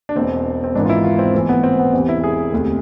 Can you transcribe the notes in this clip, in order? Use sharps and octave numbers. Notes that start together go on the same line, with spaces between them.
D4
E1 E2 B2 C4
C4
G#1 G#2 E3 D4
F4
E4
F4
C4
B1 A2 E3 C4
B3
C4
B3
E1 E2 C3 E3 C4
E4
G#4
E1 D2 C3